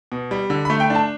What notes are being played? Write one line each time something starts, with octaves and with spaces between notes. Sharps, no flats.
B2
G3
D3
B5
A3
G5
D4 A5